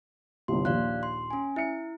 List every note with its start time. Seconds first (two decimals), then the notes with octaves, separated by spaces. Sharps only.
0.48 G1 C2 C6
0.65 A#1 D#2 D5 F5 F#6
1.03 C6
1.31 C#4 G#5
1.56 E4 E5 C#7